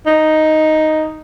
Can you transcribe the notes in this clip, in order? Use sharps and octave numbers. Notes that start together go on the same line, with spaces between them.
D#4